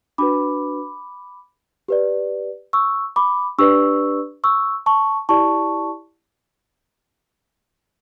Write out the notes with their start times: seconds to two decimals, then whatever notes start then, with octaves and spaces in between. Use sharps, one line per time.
0.18 D4 F#4 B4 B5 D6
1.88 G4 B4 D5
2.73 C#6 E6
3.16 B5 D6
3.58 D4 G4 B4 D5 C#6 E6
4.44 C#6 E6
4.86 A5 C#6
5.29 E4 G4 D5 A5 C#6